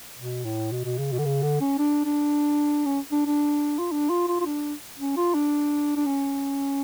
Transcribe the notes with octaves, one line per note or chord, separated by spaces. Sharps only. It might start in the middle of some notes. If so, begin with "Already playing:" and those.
B2
A2
B2
B2
C#3
B2
D3
C#3
D3
C#4
D4
D4
C#4
D4
D4
F4
D4
F4
F4
F4
D4
C#4
F4
D4
D4
C#4